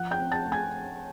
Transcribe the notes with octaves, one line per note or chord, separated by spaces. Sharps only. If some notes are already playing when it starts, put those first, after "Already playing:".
Already playing: F3 F#5 F#6
G5 G6
C4
A5 A6
A3
G#5 G#6